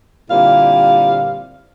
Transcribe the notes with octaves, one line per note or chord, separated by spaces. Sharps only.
A#2 D3 G3 C4 E4 F5